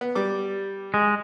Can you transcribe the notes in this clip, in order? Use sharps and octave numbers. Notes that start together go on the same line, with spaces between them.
B3
G3 D6
G#3